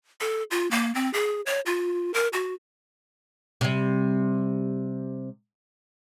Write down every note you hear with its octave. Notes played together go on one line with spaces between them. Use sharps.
A4
F4
A#3
C4
G#4
C#5
F4
A#4
F#4
C3 G3